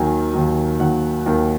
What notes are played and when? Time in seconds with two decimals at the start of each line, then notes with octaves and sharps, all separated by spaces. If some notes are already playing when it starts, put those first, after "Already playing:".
Already playing: D#2 D#3 F#3 G#5
0.33 D#2 D#3 F#3
0.79 D#2 D#3 F#3 F#5
1.26 D#2 D#3 F#3